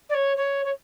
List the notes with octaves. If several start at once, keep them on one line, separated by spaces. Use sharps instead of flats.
D5
C#5
C#5
C#5